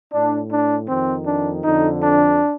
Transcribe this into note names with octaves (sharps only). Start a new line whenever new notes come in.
A2 D4
D4
F2 D#3 C4
D4
F2 D3 D#4
D4